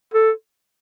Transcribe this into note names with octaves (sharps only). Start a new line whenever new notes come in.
A4